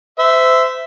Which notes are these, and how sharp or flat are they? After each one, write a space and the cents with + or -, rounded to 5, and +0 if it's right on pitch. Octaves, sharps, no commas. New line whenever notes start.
C5 -30 E5 +0